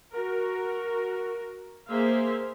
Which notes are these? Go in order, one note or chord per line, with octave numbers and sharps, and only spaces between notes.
F#4 A#4
A#3 G#4 C5 E5 F5